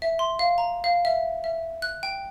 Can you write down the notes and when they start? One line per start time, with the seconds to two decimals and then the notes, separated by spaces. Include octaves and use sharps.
0.02 E5
0.19 C6
0.39 F5
0.58 A#5
0.84 F5
1.05 E5
1.44 E5
1.82 F#6
2.03 G5